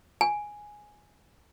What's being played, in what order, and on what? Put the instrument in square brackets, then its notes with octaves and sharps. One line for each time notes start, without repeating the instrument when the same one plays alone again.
[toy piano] G#5